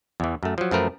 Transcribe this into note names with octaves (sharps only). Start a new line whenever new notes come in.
E2 E3
F#2 A3
F3 F#3
F#2 F3 A3 A#4 B4